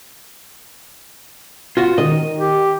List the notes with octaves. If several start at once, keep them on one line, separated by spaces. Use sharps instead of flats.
F4 F#4
D#3 D#5
G4